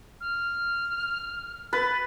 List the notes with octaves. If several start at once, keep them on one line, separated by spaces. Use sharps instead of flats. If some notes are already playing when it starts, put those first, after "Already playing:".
F6
B4 A6